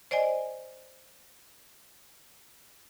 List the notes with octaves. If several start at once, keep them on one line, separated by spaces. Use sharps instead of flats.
C5 D5 D#5 G#5